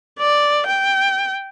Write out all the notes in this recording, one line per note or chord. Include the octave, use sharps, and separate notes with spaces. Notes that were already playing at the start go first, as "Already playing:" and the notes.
D5
G5